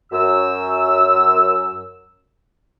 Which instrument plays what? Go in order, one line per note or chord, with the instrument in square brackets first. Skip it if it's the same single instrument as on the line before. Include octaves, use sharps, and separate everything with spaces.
[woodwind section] F#2 E6